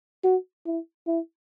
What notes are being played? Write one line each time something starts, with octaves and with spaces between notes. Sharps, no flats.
F#4
E4
E4